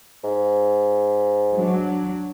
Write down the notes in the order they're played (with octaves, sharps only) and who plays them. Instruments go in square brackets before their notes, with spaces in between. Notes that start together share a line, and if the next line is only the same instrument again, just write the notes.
[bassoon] G#2
[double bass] F#3 D4